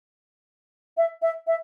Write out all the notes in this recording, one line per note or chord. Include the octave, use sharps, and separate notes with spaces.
E5
E5
E5